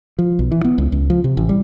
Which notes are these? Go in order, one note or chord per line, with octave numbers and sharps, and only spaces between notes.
F3
B1
E3
B3
C#2
C#2
F3
C3
A1
G3